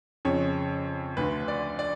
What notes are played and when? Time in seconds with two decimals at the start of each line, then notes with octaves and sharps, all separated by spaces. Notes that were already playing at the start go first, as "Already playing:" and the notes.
0.25 F2 C#3 C#5
1.17 D2 D3 B4
1.48 D5
1.79 D5